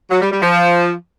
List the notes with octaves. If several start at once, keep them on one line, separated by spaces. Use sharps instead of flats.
F#3
G3
G3
F3